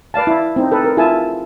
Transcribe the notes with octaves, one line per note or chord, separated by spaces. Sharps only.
B4 D5 F5 A5
E4
C4 D#4
A4 B4
A#4
E4 F4 G#4 E5 G#5 A5